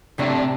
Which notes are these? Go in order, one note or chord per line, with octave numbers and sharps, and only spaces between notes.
A2 C3 F#3 A3 D4